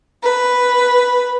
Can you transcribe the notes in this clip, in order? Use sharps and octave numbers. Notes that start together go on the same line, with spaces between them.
B4